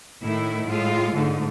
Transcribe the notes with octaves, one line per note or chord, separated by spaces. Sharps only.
A2 D#3 E4
A2 G#3 F4
G#2 D3 A3